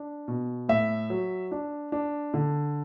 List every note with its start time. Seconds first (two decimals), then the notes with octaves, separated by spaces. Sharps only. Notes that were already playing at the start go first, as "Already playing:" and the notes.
Already playing: D4
0.28 B2
0.69 A2 E5
1.10 F#3
1.52 D4
1.92 D4
2.34 D3